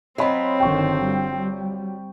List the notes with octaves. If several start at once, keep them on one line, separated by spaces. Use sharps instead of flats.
F#3 C4 F4 D#5 B5
G1 D3 D#3 G5 C#6
G3